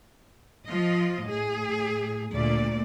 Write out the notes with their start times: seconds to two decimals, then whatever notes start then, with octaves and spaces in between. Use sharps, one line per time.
0.67 F3 F4 D#5
1.26 A2 G#4
2.31 D2 A#2 A3 D5